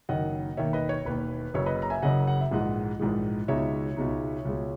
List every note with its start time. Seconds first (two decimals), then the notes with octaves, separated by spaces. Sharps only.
0.09 F#1 F#2 D#3 D#5 F#5
0.57 E1 D#2 D#3 C#5 E5
0.73 B4 D#5
0.89 C#5
1.05 E1 D#2 D#3 B4
1.54 F#1 F#2 C#3 C#5
1.66 B4 D#5
1.82 A#5
1.90 E5 G#5
2.02 F#1 F#2 C#3 D#5 F#5
2.27 F#5
2.41 E5
2.51 A#1 G#2 E3 G#3 D#5 F#5
3.00 A#1 G#2 E3 G#3
3.48 C#2 B2 G#3 D#4 C#5 E5
3.97 C#2 B2 G#3 D#4
4.45 C#2 B2 G#3